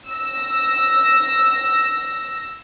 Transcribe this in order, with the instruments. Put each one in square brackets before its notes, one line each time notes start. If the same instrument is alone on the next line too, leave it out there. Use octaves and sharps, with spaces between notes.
[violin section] E6 A#6